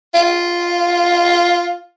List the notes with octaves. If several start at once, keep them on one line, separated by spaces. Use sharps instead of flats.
F4